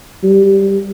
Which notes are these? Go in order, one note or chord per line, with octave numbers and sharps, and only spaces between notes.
G3